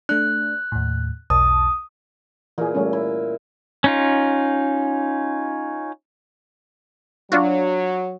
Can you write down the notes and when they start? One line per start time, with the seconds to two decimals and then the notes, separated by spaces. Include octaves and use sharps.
0.09 A3 D4 F#6
0.72 D#2 A2
1.30 B1 E2 A5 D#6
2.58 A#2 E3 G#4
2.75 G3 A3 C#4
2.93 E4
3.84 C#4 D#4 F4
7.32 F#3 D4 F4 F#4